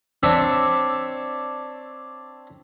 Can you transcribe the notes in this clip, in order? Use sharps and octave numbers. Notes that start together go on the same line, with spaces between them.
C4 D4 C#5 E5